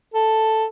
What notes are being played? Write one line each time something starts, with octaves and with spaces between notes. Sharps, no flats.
A4